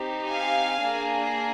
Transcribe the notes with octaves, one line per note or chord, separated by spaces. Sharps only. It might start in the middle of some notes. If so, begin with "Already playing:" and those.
Already playing: C4 D#4 G4
F5 G#5
A#3 D4 G#4